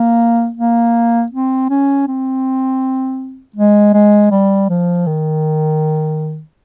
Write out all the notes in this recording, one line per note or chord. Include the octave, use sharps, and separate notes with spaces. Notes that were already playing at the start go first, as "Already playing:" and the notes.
Already playing: A#3
A#3
C4
C#4
C4
G#3
G#3
G3
F3
D#3